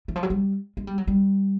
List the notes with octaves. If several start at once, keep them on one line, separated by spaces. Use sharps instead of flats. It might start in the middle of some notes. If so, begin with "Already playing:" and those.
E3
F3
F#3
G3
G#3
G3
F#3
G3